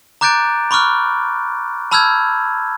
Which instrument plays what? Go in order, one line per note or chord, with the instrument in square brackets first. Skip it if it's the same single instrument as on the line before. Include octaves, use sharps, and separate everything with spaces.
[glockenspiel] A#5 D6 F#6 G6 A6 D7
B5 C#6 D6 F6 F#6
A5 B5 E6 F6 G6 G#6